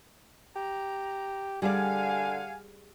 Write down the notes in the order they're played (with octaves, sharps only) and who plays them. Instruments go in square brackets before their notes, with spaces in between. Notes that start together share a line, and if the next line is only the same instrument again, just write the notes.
[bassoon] G4 [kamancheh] A#5
[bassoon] D3 [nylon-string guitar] G3 G#4 D5 [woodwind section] G4 F#5 G#5 [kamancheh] F5